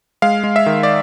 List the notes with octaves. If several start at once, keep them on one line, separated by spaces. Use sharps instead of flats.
G#3 F5
G#3
E5
D#3
D5